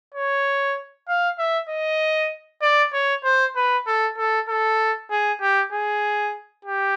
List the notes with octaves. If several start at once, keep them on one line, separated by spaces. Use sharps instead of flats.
C#5
F5
E5
D#5
D5
C#5
C5
B4
A4
A4
A4
G#4
G4
G#4
G4